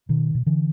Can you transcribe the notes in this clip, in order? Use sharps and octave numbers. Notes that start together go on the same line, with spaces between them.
B2 D#3
B2
D3 E3